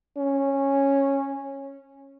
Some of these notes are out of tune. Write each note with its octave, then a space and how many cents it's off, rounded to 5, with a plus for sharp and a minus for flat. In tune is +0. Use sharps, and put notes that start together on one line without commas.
C#4 -10